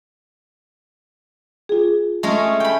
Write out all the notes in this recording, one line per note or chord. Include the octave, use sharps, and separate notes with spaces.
F4 G#4
G#3 A3 C#4
G5 B5